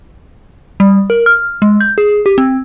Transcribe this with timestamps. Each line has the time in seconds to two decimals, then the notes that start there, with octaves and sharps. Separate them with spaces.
0.80 G3
1.10 A#4
1.26 F6
1.62 G#3
1.81 G6
1.98 G#4
2.26 G4
2.38 C4